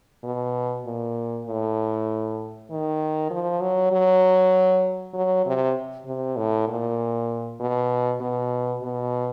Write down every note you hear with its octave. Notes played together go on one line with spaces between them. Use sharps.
B2
A#2
A2
D#3
F3
F#3
F#3
F#3
C3
C3
A2
A#2
B2
B2
B2